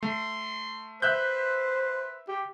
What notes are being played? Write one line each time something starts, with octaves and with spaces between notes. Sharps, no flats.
A3 C6
B4 C5 E5 F#6 G6
G4